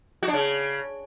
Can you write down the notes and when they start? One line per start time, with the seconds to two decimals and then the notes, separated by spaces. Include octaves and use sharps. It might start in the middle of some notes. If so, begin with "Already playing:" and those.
0.23 F#4
0.28 D4
0.34 C#3